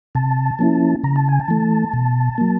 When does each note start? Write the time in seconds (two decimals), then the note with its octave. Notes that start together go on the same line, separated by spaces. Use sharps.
0.15 C3 A5
0.59 F3 A#3 C#4 E4
1.04 C#3 A#5
1.16 A5
1.29 G#5
1.40 A5
1.48 E3 A3
1.94 B2
2.38 F#3 A#3